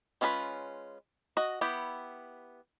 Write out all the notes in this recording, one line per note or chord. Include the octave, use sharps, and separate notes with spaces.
G#3 C#4 F4 G#4 B4
F#4 D#5
B3 E4 G4